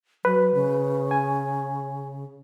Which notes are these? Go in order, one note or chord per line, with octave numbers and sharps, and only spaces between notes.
F#3 B4
C#3
G#5